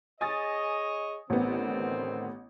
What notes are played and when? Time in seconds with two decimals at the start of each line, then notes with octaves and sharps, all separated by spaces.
0.21 G#4 C#5 D#5 G#5 D#6 A6
1.30 A1 D3 D#3 B3 C4